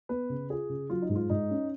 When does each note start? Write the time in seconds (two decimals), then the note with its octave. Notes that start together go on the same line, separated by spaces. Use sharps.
0.09 B3 B4
0.29 C#3
0.50 F4 G#4
0.69 C#3
0.90 F#3 F4
1.02 D#4
1.09 G#2
1.15 F4
1.30 G#2 D#4
1.50 C#4